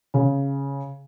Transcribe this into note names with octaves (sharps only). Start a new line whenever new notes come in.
C#3